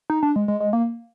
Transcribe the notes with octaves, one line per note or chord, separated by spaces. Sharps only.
D#4
D4
G#3
G#3
G#3
A#3